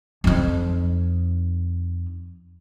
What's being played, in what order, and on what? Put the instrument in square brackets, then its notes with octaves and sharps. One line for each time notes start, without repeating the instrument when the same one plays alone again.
[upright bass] F2 D#4